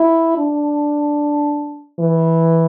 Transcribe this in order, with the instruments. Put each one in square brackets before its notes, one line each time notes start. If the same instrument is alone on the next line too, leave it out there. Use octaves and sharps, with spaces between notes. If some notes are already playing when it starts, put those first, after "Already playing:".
Already playing: [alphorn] E4
D4
E3